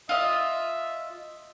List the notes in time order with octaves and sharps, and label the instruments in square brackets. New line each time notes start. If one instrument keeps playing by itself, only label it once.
[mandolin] F4 D#5 [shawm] E5